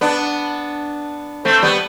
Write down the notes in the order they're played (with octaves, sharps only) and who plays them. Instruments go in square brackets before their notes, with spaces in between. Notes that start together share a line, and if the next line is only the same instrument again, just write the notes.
[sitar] B3 D4
A3 C4
G3 B3